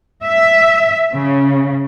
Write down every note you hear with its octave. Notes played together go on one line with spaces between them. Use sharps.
E5
C#3